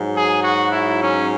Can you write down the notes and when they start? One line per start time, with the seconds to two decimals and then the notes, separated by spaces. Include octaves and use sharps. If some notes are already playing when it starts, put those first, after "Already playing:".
Already playing: G#2 F#3
0.14 G#4
0.42 F#4
0.72 E4
1.02 C#4